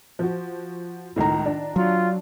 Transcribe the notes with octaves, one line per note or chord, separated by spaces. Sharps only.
F3 F#4
C#2 A2 D#3 A#5
D4
F#3 F4